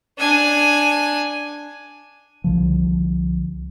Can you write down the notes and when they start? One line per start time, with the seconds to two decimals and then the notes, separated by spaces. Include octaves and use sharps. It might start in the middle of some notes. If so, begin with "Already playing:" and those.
0.19 D4 G#5
2.44 C2 D3 F3